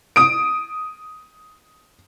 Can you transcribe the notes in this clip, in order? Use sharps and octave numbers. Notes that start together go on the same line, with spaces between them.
D#6 D7